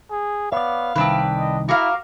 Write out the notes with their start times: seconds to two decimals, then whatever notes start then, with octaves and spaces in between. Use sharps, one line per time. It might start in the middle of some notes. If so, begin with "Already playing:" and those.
0.11 G#4
0.52 B3 C#5 D5 F5
0.96 C2 D#3 C4 D4 E4 B4
1.38 D#5
1.69 E4 F#4 A#4 F5 D6